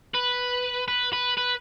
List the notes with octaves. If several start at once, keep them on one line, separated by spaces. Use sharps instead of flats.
B4
B4
B4
B4